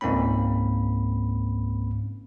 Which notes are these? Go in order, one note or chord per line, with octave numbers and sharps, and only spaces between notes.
C#2 G#2 A#3 C4 C#4 B5